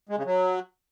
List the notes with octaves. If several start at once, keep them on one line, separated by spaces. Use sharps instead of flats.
G#3
C#3
F#3